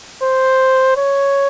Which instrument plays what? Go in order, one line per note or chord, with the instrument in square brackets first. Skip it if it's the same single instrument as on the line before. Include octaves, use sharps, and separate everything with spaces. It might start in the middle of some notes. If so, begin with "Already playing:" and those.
[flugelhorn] C5
C#5